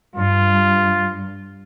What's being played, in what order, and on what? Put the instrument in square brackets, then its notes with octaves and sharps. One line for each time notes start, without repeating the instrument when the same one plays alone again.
[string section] G2 [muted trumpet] F4